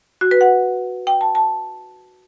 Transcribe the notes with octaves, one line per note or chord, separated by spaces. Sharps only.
F#4
B4
F#5
G5
A5
A5